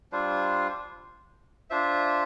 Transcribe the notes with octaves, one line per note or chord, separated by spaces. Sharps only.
G3 D4 F4 C5
D4 F4 C5 E5